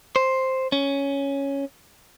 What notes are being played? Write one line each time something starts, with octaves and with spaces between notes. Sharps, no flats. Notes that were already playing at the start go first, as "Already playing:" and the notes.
C5
C#4